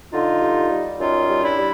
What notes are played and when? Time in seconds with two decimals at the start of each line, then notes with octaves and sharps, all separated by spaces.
0.13 D3 D#4 F4
0.41 G3
0.70 G3
0.99 F#2 D#4 F4
1.29 G3
1.43 D4 E4
1.56 G3